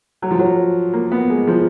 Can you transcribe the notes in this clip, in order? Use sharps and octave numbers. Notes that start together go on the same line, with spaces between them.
F#3
F3
F#3
A#3
B3
G#3
F3